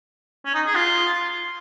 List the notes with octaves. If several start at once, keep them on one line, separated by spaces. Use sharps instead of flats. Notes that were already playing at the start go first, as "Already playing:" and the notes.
C#4
D#4
G#4
F4